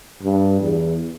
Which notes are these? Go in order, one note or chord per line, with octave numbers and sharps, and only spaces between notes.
G2
E2